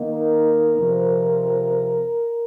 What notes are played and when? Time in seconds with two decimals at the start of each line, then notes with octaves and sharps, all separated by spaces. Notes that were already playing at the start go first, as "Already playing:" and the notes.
Already playing: D#3 A#3 D#4
0.13 A#4
0.77 F2 C3 F3 C4